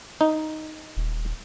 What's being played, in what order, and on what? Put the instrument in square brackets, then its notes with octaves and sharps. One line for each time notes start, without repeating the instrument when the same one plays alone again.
[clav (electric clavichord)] D#4
[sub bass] D#1